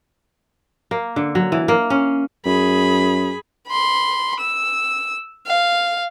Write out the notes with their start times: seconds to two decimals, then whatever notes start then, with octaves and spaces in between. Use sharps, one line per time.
0.91 A#3
1.16 D3
1.35 F#3
1.52 E3
1.68 A#3
1.90 C#4
2.46 F#2 G#4 B5
3.68 B5 C6
4.40 E6
5.47 F5